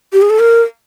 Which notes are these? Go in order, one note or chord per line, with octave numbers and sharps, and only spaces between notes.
G4
G#4
A4
A#4